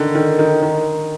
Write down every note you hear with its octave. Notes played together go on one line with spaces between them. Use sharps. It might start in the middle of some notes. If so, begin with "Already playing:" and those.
Already playing: D3 D#3
D#3
D#3
D#3